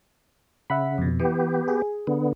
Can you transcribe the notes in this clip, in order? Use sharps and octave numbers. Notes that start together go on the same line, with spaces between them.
C#3 E5 F#5 B5
F2 B2
E3 B3 G4
G#4
D3 B3